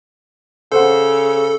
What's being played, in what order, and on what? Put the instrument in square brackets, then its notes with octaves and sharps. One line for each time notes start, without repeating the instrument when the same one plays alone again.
[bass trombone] C#3 [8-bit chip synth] A4 [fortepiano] C5 F#5